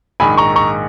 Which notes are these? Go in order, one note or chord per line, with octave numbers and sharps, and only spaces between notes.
A#1 G#2 D#3 G#5 B5
A#5 C#6
A#5 C#6